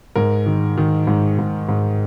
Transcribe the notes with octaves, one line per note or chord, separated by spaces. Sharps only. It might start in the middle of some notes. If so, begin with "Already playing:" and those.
G#2 A#4
D#3
D#3
G#2
G#2
G#2